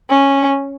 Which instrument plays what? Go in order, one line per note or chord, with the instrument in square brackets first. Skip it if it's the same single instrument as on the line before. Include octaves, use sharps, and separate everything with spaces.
[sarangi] C#4